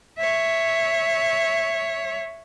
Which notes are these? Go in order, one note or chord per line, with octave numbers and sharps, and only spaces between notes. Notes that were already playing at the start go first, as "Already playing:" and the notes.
C#5 E5